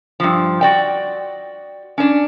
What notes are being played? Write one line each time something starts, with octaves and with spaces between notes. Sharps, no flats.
G2 F3
F#4 D5 G5
C#4 D4